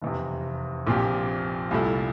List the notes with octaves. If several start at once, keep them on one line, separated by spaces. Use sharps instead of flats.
F1 E2 C3
A#1 A#2 F3 C4 G4
C2 A#2 A3 E4